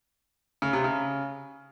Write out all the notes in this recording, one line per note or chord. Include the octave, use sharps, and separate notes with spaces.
C#3
C3
C#3